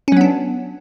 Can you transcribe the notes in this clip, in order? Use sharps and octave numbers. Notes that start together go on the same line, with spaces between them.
F#3 B3 C#4 D4